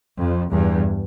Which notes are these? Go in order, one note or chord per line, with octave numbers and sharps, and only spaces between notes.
F2
E2 G2